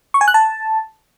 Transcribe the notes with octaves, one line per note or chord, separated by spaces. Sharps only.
C#6
G#5
F#6
A5